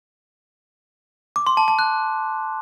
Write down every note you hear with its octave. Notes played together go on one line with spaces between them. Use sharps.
D6
C6
A5
A5
F#6